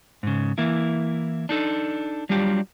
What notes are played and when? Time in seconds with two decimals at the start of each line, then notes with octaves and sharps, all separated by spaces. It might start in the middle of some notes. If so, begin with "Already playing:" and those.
0.23 G#2 C#3
0.58 E3 A#3 E4
1.49 D4 D#4 A4
2.29 F#3 G3 D4 F4 G4